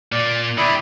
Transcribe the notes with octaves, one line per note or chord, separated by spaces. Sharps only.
A#2 D5
D3 E4 G4 D5 D#6